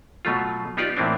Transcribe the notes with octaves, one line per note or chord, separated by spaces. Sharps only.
B2 F#3 A3 F4
B3 D#4 F4 G4 D5
A2 E3 A#3 C4 D4